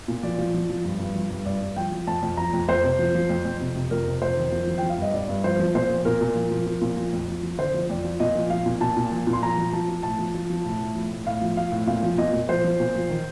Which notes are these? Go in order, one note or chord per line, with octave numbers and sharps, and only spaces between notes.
A#2
F3 D5
F3
F3
F3
G2
G2
F3
G2
G2 D5
G2
F3 G5
F3
F2 A5
F2
F3 A#5
F2
F2 C5
C3
F3
F3
F2
F2
C3
C3
F2 A#4
C3
F2 C5
D#3
F3
F3
F3 G5
F5
G2 D#5
G2 D5
G2
F3 C5
F3
A#2 C5
F3
A#2 A#4
A#2
F3
F3
F3
A#2
F3
F2
F3
F3
D3 C5
F3
F2 D5
F3
A#2 D#5
F3
F3 F5
A#2
A#2 A5
A#2
F3
A#2
C6
F3 A#5
F3
F3 A5
F3
A2 A5
F3
F3
F3
A2
A2
F3
A2
A2 F5
F3
F3 F5
A2
A#2 F5
F3
A#2 D#5
A#2
F3 C5
F3
A#2
F3
D#3